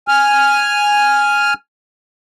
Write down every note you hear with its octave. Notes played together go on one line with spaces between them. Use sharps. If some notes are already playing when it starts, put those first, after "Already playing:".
G#5 F6